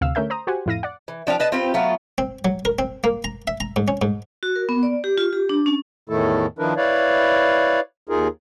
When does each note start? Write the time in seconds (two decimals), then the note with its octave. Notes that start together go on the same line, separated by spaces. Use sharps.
0.01 D2 C3 F5 E6 F6
0.15 D3 A3 C#4 A#4 E5 G6
0.30 C5 A#5 D#6
0.47 F#4 G4 C5 F#5 G#5
0.66 F2 A2 E4 F5 A#6 D#7
0.83 D5 F#5
1.08 E3
1.27 F3 D4 G4 F5
1.40 B4 D#5 A5
1.52 C4 F4 G4 B4
1.74 F#3 A3 B3 F4
2.18 C4
2.45 F#3
2.65 A#4
2.79 C4
3.04 A#3
3.24 A#5
3.47 E5
3.60 A#5
3.76 G#2
3.88 C#4
4.02 G#2
4.43 F#4
4.56 A#4
4.69 B3
4.83 D5
5.04 G4
5.18 F4
5.33 G4
5.49 D4
5.66 C#4
6.09 E2 A2 D#3 A3 E4 A4
6.59 D#3 F3 D4 E4 A#4 B4
6.77 E4 B4 C#5 D5 F5
8.09 D#2 D#4 F4 G#4 A#4